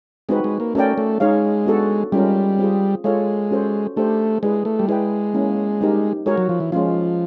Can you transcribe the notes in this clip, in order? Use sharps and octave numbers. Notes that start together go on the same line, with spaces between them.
G#3 C4 D#4 F#4 B4
G#3
A#3
A3 C#4 F#4 A#4 D5 G5
A3
G#3 D#4 G#4 C#5 F5
B3 D4 F#4 A4
G3 G#3 C#4 F4 A#4
C4 F4 G#4
G#3 F4 A4 C#5 F5
C#4 F#4 A4 C5
A3 D4 G4 C5
G#3 E4 G#4 B4 D5
A3
G3
G#3 E4 G#4 B4 D5 G5
A#3 C#4 E4
G3 C4 D#4 G4 A#4
G#3 F#4 A#4 C#5
F#3
F3
E3
F3 G#3 C#4 F4